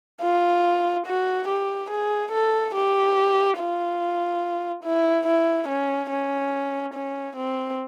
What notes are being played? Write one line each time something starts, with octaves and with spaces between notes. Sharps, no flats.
F4
F#4
G4
G#4
A4
G4
F4
E4
E4
C#4
C#4
C#4
C4